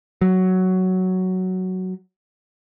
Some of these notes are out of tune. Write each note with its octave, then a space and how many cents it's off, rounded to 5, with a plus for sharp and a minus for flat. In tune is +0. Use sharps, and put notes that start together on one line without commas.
F#3 +5